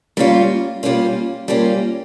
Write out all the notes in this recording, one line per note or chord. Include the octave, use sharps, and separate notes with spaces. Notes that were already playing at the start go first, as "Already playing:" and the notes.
G3 A#3 C#4 F4
G3 A#3 C#4 F4
G3 A#3 C#4 F4